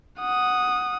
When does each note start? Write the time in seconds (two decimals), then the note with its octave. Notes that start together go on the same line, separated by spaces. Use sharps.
0.20 F#5 D#6